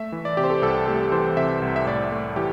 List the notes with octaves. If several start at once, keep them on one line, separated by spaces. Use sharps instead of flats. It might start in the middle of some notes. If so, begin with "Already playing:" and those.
Already playing: A3 E5
E3
D5
C3 G4
C5
A4
C2 A4
A3 G4
E3 C5
C3 E5
C2
E5
A2 D5
A3
E3 G4